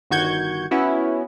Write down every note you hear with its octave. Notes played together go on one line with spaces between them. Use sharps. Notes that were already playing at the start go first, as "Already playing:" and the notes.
G1 D#3 F#4 C#6 G6 G#6
B3 C#4 E4 F#4